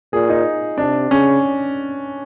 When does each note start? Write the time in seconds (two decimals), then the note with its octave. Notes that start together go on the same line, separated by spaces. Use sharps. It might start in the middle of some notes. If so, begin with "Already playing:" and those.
0.13 A#2 G#4
0.30 D#4
0.77 C3 D4
1.11 C#3 C#4